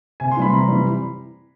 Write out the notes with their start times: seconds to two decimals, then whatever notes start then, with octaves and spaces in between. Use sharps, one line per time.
0.20 C3 G#5
0.31 C6
0.37 E3 G3 B5
0.52 C3 A#5
0.68 E3 G3